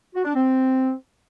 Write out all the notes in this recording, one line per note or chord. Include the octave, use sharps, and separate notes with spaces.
F#4
D4
C4